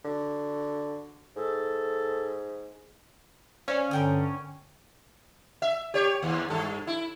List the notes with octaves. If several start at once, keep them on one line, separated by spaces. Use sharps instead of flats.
D3 F#4
G#2 A4
C#4 C5 D5 F5 G#5
G2 D3 A#4 G5 D#6
E5
G4 C#5
D#2
G2 A4
E4